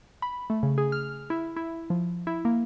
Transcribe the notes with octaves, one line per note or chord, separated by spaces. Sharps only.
B5
A3
C#3
G#4
F6
E4
E4
F3
E4
A#3